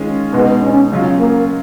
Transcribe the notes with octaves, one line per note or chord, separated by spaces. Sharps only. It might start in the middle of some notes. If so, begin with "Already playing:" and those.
Already playing: D#3 G#3 C#4 F4
B2 G#3 B3 D#4
C#4
C#3 F#3 C#4 F4
A#3